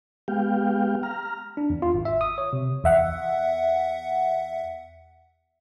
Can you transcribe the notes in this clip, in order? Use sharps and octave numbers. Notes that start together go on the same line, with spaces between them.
G#3 B3 G4 F5 G5
A#5 F6
D4
E2
F4
G#1
E5
D#6
C#5
C3
E2 E5 F#5